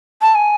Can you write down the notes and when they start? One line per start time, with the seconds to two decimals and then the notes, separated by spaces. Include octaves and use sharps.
0.22 A5
0.35 G#5